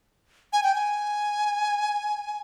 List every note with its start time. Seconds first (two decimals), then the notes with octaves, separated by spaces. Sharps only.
0.53 G#5
0.63 G5
0.75 G#5